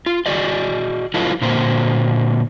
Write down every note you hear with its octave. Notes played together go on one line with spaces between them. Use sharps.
F4
F#4 G#4 D5 D#5
F#3 E4 F4 A4 B4 D#5
A#2 D3 A#3 F#4 C5 A#5